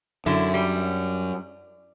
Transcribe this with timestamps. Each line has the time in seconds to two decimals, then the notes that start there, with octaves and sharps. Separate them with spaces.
0.26 F#2 D3 E4
0.54 G3